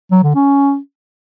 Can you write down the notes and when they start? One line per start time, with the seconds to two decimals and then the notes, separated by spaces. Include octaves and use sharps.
0.11 F#3
0.23 D3
0.35 C#4